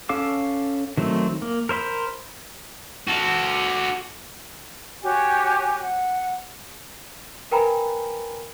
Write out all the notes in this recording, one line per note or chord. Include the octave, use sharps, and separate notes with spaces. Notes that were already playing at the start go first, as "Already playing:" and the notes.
C#4 A4 F5 D6
D#3 F#3 A3 C4
A#3
A#4 C5 E5 B5
F#4 A4
F#4 G4 C#5 G#5
F#5
A#4 B4 G5 G#5 A#5 B5